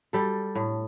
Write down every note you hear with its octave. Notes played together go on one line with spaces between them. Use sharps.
G3 A4
A2